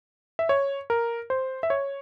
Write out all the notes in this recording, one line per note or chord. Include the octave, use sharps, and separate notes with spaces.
E5
C#5
A#4
C5
E5
C#5